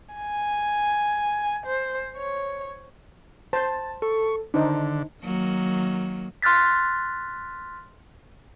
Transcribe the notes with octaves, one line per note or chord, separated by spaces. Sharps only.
G#5
C5
C#5
C5 A5
A4 C#6
D3 D#3 D4 D#4 C5
D#3 F#3 A#3
C6 F6 F#6 A6 B6